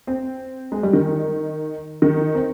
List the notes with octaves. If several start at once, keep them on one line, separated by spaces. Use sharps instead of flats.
C4
G#3
G3
D#3
D#3
C4